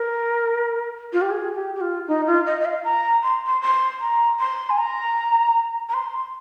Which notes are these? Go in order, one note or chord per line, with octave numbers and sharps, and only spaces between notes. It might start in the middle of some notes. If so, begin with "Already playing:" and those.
Already playing: A#4
F4
G4
G#4
G4
G4
F4
D#4
F4
D#5
D#5
F5
A#5
C6
C6
C6
A#5
C6
G#5
A#5
A#5
C6